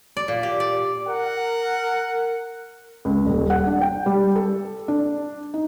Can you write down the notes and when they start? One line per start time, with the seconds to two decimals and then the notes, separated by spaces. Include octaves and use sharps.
0.17 D5
0.28 A#2
0.43 G4
0.60 D5
1.08 A#4 F#5
3.05 C#2
3.26 D#1
3.50 F#5
3.67 D4
3.81 G5
4.06 G3
4.36 A4
4.88 D4
5.54 D#4